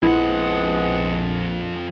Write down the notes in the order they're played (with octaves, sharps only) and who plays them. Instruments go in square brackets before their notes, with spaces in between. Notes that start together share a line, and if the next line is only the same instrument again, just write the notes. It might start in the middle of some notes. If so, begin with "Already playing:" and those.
[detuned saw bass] A#1 [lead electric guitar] F2 F#5 [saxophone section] F3 G#3 B3 [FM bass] E4